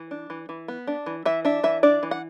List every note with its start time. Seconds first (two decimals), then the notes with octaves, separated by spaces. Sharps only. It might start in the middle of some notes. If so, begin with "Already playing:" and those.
Already playing: E3
0.11 D4
0.30 E3
0.49 E3
0.68 B3
0.87 D4
1.06 E3
1.25 E3 E5
1.45 D4 E5
1.63 E3 E5
1.83 D4 D5
2.03 E3
2.11 F#5